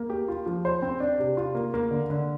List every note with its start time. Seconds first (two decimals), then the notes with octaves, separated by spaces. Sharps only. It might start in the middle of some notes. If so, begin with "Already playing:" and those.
Already playing: A#3
0.10 G4
0.28 F4
0.46 F3
0.65 C5
0.82 C4
1.00 D4
1.19 C3
1.37 F4
1.55 A#3
1.74 A#3
1.91 D3
2.10 D3